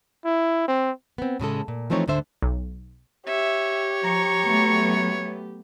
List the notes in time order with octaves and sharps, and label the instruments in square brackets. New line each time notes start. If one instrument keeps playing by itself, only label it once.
[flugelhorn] E4
C4
[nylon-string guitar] B3 C4
A2 C#3 G#3 A4
A#2
E3 F3 A3 C4 D#4 C#5
D2 G#2 D3 A4 C5 E5
[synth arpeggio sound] B1
[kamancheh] G4 [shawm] C#5 [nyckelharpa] E5
[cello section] F3 [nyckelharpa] A#5 C#6
[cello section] F#3 A3 B3